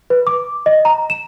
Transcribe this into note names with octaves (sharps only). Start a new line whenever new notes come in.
B4
D6
D#5
A#5
E7